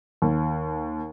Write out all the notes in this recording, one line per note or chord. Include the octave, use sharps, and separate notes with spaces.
D#2